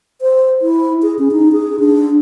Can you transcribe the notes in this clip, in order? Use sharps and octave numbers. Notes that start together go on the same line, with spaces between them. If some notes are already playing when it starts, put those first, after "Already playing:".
C5
E4
G#4
C#4
D#4
G#4
D4